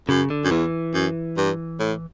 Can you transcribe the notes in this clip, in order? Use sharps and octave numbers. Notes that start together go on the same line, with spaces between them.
F#2 C#3
D3
F#2
E2 E3
F#2
G2
A2